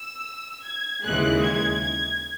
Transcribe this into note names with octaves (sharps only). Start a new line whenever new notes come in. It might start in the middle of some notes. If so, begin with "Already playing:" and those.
Already playing: E6
G#6
D#2 C#3 E3 G#3 F#6
G#6
G#6